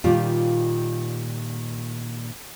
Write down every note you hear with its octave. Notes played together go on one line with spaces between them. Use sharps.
A#2 D#3 G3 F4 G4